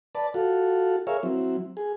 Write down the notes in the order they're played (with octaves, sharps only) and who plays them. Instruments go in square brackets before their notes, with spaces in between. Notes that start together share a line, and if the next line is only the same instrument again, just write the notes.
[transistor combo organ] B4 D5 A5
F4 F#4 A4
G#4 A#4 C#5 E5 F5
F#3 C4 E4
G#4